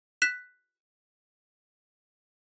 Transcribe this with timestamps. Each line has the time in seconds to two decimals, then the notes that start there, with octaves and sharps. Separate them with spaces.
0.22 F#6 B6 E7